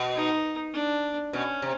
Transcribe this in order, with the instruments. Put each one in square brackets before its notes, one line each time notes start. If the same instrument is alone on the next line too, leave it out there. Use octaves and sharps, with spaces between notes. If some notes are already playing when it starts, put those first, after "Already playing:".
Already playing: [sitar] B2
[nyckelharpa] D#4
D4
[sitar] B2 [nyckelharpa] C#4
[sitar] C3